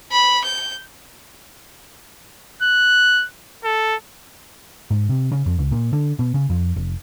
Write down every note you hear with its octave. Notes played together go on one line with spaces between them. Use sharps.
B5
G6
F#6
A4
G#2
C3
C#3
F2
C#2
A#2
D3
B2
C#3
F2
F1